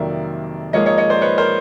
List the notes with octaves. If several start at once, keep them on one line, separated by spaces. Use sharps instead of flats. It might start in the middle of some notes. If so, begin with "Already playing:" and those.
Already playing: F2 C3 D#3 F#3 A#3 D5 E5
G#2 F3 A#3 C#5 D#5
C#5 D#5
C#5 D#5
C5 D5
B4 C#5
A#4 C5